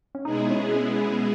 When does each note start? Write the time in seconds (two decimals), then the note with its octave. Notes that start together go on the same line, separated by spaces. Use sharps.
0.15 C#4
0.25 B2 G#3 B3 D#4 E4 G#4
0.50 C#4
0.76 C#4